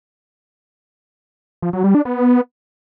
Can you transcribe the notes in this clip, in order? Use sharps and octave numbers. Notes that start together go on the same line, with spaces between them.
F3
F#3
G3
D4
B3